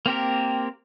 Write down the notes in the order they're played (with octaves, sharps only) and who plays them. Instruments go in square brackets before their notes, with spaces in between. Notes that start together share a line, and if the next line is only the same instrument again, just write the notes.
[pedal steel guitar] A#3 C4 G4 A#4